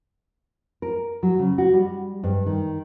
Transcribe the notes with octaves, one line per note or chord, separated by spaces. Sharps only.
A#4
F#3
C#3
F#4
G3
G2
D#3